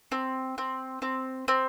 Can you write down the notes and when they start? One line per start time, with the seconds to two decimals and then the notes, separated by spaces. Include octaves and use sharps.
0.12 C4
0.58 C4
1.02 C4
1.48 C4